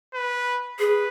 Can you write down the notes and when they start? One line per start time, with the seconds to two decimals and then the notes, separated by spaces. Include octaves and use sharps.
0.14 B4
0.79 G#4 B4